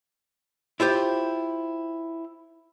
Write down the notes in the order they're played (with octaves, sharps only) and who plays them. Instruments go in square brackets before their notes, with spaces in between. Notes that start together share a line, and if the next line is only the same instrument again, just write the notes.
[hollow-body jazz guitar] E4 F4 G4 C5